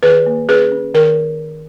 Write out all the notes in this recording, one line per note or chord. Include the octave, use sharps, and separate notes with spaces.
D#3 G#4 B4
A#3
C#4 G#4 B4
C#4
D#3 A#4